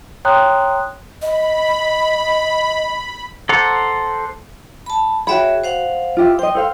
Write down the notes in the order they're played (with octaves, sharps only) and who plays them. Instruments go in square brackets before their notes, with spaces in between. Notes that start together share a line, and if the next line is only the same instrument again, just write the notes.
[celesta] C#5 G5 A#5 C6 D#6 F#6
[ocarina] D#5 [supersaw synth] B5
[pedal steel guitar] A4 C5 F#5 A#5 D6
[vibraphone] A5 B5
[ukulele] F#4 G5 B5 [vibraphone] G#4 C#5 E5
[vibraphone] C5 F5 F#5
[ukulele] F4 G4 E5
[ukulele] C5 D#5 [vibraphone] G5
[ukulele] A4 C5 F5